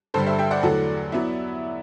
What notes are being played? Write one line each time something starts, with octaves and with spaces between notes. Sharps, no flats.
G2 D3 G3 A4 C5
C5 E5
E5 G5
D5 F#5
E2 D3 F#3 A3
F#3 B3 E4